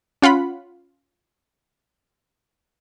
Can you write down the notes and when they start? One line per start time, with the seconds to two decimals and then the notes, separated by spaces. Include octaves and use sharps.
0.22 C#4 F4 F#5 B5